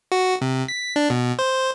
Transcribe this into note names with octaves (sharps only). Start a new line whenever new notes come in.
F#4
C3
B6
D4
B2
C5